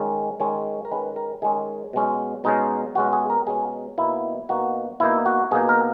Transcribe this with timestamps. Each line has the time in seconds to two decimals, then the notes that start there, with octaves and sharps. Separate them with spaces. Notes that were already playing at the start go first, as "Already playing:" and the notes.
Already playing: D#3 G#3 C#4
0.40 D#3 G#3 C#4 C#5
0.85 A#4
0.91 D#3 G#3 C#4 B4
1.16 A#4
1.42 D#3 G#3 C#4 G#4
1.93 B2 G#3 C#4
2.44 B2 G#3 C#4 D#4
2.95 B2 G#3 C#4 F#4
3.13 G#4
3.30 A#4
3.47 B2 G#3 C#4 G#4
3.98 B2 A#3 D#4 E4
4.49 B2 A#3 D#4 F#4
5.00 B2 A#3 D#4 E4
5.26 F#4
5.51 B2 A#3 D#4 G#4
5.69 A#4